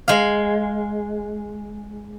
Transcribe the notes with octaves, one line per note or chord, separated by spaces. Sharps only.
G#3 F5